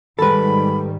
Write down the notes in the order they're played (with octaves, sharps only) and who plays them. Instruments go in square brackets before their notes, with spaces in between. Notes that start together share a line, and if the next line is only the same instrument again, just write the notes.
[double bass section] G#2 D#3 G3 [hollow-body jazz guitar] A4 B4 [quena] B5